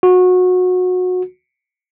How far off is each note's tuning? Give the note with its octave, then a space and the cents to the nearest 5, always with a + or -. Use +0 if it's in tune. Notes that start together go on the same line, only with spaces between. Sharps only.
F#4 -25